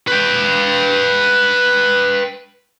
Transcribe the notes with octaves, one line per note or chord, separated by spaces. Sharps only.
B4 G5